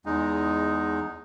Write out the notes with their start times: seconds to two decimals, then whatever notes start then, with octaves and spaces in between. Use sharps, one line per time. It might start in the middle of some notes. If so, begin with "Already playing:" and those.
0.06 E2 G#3 D#4